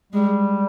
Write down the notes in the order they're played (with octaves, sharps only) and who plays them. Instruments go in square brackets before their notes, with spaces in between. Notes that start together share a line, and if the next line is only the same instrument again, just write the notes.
[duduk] G3 [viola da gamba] G#3